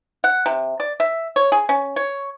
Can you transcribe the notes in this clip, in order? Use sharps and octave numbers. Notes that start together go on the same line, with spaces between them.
F#5
C3
D5
E5
C#5
G#4
C#4
C#5